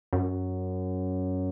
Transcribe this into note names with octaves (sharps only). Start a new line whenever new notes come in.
F#2